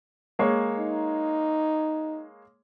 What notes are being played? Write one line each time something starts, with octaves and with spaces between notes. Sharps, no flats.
G#3 A#3 C#5
D#4